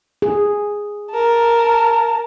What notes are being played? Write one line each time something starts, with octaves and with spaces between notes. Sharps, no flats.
G#4
A#4 A5